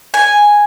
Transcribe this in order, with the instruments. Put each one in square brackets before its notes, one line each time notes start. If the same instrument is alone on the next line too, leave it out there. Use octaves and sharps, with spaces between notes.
[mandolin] G#5